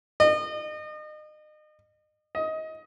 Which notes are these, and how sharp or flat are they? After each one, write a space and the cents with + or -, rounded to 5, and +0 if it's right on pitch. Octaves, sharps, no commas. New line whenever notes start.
D#5 -35
D#5 +20